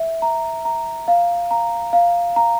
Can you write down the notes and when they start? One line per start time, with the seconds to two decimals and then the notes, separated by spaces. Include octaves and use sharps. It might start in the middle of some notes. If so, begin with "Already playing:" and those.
Already playing: E5
0.22 A#5
0.65 A#5
1.08 F5
1.51 A#5
1.93 F5
2.36 A#5